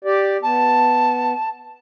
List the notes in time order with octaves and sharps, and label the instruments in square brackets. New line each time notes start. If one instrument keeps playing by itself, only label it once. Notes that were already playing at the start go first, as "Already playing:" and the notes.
[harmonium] G4 D5
[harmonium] B3 [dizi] A5